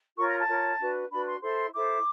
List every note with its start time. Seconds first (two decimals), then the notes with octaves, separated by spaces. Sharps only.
0.16 F4 A#4 C#5 C#6
0.27 A#5
0.38 A5
0.47 F4 A#4 C#5
0.78 D4 F#4 B4
1.10 D4 F#4 B4 B5
1.26 C6
1.41 E4 A4 C5 C6
1.73 E4 A4 C5 D6